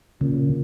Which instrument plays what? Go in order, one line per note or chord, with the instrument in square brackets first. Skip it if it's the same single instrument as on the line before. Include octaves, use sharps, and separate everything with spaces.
[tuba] A#2 [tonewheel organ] C#3